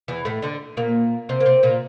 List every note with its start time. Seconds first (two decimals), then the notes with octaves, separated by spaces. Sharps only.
0.08 E2 E3
0.25 A2 A3
0.42 D3 D4
0.77 A#2 A#3
1.29 C3 C4
1.40 A#3
1.46 C3 C4
1.63 A#2 A#3